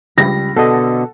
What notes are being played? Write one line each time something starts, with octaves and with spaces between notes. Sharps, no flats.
C#2 G3 B5 A#6
B2 D3 A4 D#5 F#5